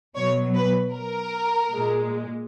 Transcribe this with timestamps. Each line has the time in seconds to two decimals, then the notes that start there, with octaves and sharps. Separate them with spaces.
0.16 B2 F#3 C#5
0.55 B4
0.93 A#4
1.71 A#2 G#3